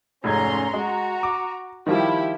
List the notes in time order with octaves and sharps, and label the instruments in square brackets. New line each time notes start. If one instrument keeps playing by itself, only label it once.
[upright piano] F1 G#2 G#6 [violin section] C#4 A#5 C6
[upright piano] G#3 [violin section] F#4 A#5
[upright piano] D6
[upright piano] D#3 F3 G3 [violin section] E4 G4